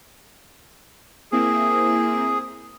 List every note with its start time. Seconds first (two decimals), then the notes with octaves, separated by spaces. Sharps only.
1.32 A#3 C4 E4 G#4